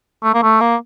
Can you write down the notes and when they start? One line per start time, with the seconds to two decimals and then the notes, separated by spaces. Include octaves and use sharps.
0.23 A3
0.34 A#3
0.42 A3
0.61 A#3